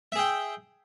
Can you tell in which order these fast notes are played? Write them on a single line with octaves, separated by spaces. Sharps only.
E5 G#4 G5